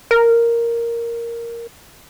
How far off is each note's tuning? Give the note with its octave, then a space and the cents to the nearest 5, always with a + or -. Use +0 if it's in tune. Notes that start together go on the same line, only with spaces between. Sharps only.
A#4 +0